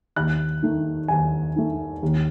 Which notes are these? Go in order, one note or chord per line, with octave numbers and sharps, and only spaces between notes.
D#2 F#6
D#3 A3
D#2 G#5
D#3 A3
D#2